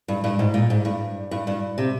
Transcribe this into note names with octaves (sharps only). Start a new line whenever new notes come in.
G2
G2
G#2
A#2
G#2
G2
G2
G2
C3